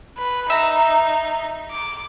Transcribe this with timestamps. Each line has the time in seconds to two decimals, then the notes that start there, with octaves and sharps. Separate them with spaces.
0.18 B4
0.50 D#4 E5 A#5
1.71 D6